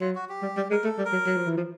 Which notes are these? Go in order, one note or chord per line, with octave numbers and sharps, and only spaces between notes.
F#3 F4
F#4
G4
G3
G3
G#3 A#4
A3 A4
G3
A#4
F#3
F#3
F3
E3
F3